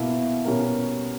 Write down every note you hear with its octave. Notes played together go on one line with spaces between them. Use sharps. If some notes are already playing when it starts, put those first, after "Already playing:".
Already playing: B2 A#3 E4
B2 G3 C#4 G4 A#4